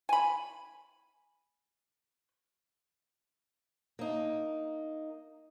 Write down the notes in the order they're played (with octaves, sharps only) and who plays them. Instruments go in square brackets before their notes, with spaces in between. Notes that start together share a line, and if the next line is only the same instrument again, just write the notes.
[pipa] G#5 B5
[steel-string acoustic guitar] A#3 D#4